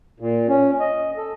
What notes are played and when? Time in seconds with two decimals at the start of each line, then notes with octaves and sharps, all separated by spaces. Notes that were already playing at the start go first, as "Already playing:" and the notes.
0.20 A#2
0.48 C#4
0.80 D#5
1.17 A4